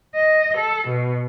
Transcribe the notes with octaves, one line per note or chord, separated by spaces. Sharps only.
D#5
A4
B2